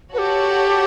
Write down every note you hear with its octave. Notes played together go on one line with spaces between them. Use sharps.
F#4 G4 A4 B4 C#5 F#5 A5